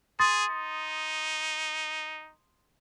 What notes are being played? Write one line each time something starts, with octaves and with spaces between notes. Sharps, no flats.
G#4 C6 D#6 A6
D#4